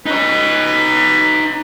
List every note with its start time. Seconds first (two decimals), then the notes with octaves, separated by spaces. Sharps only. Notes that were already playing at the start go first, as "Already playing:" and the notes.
0.06 D#4 B4 C#5